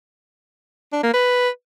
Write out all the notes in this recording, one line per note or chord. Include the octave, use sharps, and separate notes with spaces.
D4
A#3
B4